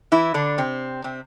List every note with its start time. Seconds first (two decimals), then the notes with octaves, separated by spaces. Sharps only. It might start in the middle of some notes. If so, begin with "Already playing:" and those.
0.12 E3 E4
0.34 D3 D4
0.58 C3 C4
1.04 C3 C4